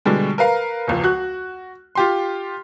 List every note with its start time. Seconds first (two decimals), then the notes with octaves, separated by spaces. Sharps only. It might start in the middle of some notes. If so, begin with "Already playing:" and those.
0.05 B2 D3 G3 G#3
0.38 A#4 B4 F5 A#5
0.88 E1 C#2 F3
1.04 F#4 F#6
1.95 F4 G4 C6